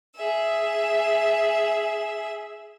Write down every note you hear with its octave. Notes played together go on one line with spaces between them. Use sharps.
G#4 E5